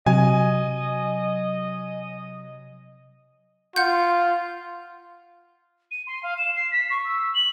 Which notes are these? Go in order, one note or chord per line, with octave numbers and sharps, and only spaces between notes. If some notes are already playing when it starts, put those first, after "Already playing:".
C3 F#3 D#5 G#5
F4 F#5 G6
D#7
C6
F5
E7
C7
B6
C#6
E6
F#7